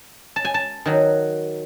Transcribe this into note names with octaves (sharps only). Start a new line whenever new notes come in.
A5
G#5
A5
D#3 F#3